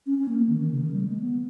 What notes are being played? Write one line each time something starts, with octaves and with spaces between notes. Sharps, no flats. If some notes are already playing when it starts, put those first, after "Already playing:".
C#4
C#4
A#3
A#3
D#3
D#3
C#3
D#3
G3
A#3
G#3
B3